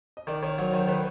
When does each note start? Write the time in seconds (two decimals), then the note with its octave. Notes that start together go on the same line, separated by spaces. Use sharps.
0.17 D#5
0.27 D#3 D5
0.43 D#3 C#5
0.58 F#3 C5
0.69 C#5
0.73 D#3
0.79 C5
0.88 D#3 B4